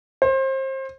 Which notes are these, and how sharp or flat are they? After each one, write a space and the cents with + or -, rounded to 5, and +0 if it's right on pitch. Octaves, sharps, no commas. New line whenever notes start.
C5 +30